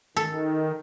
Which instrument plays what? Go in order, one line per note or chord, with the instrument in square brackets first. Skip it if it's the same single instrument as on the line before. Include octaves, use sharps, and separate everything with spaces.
[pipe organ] D#3 [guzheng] A4